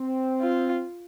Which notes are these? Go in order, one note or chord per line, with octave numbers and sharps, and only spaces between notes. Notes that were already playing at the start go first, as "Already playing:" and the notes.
Already playing: C4
F4